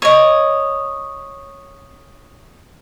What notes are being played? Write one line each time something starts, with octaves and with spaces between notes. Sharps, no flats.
C#5 D#5